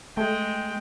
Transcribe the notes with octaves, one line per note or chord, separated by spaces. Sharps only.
G#3 A3 G5